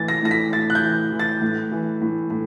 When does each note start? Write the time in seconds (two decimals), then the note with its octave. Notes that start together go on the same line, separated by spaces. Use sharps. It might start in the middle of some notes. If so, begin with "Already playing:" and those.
Already playing: A2 E3 A6
0.08 A#6
0.23 A2 A#6
0.31 B6
0.53 A2 A6
0.70 F#6
0.75 G6
0.83 E3
1.12 E3
1.20 A6
1.42 A2
1.72 E3
2.02 A2
2.30 A2